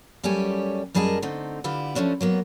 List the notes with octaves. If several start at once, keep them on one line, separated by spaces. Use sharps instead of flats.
F#2 G3 A3 C#4 G4 G#5
F#2 G3 G#4 A#4 D#5 A5
D3 A3 C4 D#4
D3 E4 F4 G4 B4
F3 G#3 A3 C#4 D4
F#3 A#3 B3